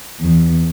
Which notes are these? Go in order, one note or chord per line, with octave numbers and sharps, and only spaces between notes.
E2